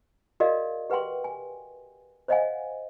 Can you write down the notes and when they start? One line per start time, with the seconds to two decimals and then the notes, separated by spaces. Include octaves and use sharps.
0.40 F#4 G#4 A#4 D5 D#5 F5
0.90 G4 B4 F#5 G5 C6
1.24 G#5
2.28 C5 C#5 D#5 F5 F#5 G#5